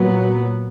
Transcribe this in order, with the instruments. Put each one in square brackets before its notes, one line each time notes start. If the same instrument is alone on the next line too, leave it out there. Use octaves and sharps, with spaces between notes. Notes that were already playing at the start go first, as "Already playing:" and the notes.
Already playing: [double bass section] A#2 F#3 B3